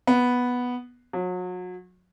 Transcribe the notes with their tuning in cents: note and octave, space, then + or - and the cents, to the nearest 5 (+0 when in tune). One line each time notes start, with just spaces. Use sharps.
B3 -5
F#3 -35